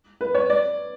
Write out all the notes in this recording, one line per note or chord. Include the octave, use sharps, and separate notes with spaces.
B4
C#5
D5